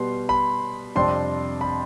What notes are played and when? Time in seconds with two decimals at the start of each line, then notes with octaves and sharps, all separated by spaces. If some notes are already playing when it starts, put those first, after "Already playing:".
Already playing: B2 G3 B3 C6
0.29 B5
0.95 F2 C3 G3 D4 C6
1.61 B5